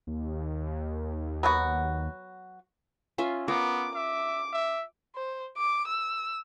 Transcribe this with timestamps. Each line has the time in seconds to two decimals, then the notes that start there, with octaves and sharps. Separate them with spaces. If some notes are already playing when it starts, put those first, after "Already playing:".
0.07 D#2
1.43 F#3 B3 F#4
3.18 C#4 F4 E5
3.48 B3 F4 A#4 C#5 D6
3.95 E5 D6
4.53 E5
5.16 C5
5.58 D6
5.87 E6